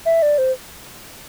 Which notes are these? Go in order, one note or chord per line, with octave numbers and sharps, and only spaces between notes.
E5
D5
C5